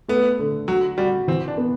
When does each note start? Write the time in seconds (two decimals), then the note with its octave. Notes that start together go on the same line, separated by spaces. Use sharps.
0.08 A3 B3
0.39 D3
0.68 F#3 F#4
0.98 G3 F#4
1.28 E3 C4
1.48 D4
1.57 B3